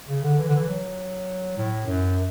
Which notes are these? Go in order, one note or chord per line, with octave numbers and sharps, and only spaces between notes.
C#3
D3
E3
D3
E3
F#3
A2
F#2